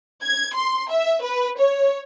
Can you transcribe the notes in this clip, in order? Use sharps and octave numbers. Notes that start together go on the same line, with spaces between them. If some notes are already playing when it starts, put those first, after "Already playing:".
G#6
C6
E5
B4
C#5